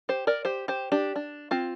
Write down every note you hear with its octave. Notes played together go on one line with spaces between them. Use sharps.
G4 C5
A#4 D5
G4 C5
G4 C5
D4 G4
D4
C4 F4